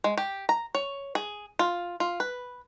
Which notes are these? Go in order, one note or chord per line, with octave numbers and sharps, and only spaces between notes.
G#3
G4
A#5
C#5
G#4
F4
F4
B4